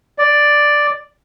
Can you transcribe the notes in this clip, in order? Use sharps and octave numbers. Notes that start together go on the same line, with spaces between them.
D5